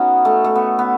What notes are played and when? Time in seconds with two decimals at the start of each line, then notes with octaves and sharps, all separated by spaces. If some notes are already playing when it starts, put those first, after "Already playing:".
Already playing: B3 C#4 D#4 F#4
0.25 A3
0.44 A3
0.56 B3
0.79 B3